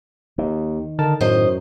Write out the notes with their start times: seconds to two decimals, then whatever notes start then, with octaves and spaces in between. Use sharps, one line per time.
0.38 D#2 D#3
0.99 D3 D#4 A#4 A5
1.21 F#2 A2 F#3 C5 D#5